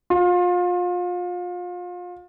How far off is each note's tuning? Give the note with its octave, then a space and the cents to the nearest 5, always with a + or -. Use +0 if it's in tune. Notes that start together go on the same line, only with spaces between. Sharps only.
F4 +30